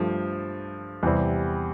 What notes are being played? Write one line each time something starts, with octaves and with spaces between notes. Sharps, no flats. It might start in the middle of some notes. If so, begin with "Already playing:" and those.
Already playing: G2 F3 A3
E2 C3 G3 C4